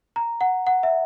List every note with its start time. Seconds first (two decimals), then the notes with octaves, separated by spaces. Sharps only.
0.16 A#5
0.41 F#5
0.67 F#5
0.83 E5